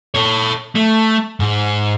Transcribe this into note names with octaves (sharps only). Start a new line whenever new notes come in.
A4 C#5
A3
G#2